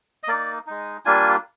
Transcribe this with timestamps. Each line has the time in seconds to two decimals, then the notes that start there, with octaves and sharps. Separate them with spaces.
0.23 D#5
0.28 A#3 D#4 D5
0.67 G#3 D#4
1.05 G3 A#3 D4 F4 G#5